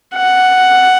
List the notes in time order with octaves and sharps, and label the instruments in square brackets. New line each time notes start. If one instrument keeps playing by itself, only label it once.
[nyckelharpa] F#5